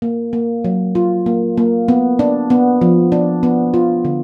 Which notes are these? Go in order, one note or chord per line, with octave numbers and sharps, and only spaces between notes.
A#3
A#3
F#3
F4
A#3
A#3
B3
D4
B3
F3
D4
B3
F4
D3